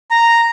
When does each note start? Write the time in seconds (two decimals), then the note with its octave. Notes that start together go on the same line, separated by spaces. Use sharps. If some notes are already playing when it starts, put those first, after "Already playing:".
0.11 A#5